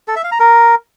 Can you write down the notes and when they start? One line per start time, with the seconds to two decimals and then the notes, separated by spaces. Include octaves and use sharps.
0.08 A4
0.16 E5
0.24 F5
0.32 A#5
0.40 A#4